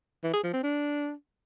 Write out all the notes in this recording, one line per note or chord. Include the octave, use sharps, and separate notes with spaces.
E3
G#4
F3
C4
D4